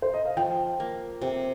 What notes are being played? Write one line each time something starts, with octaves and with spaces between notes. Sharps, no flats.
C5
D#5
F5
F3 G5
A#3
C3 G5